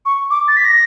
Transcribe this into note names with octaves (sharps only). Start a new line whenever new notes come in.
C#6
D6
A6
B6
A#6